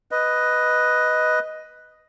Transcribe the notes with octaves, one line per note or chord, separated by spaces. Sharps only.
B4 D#5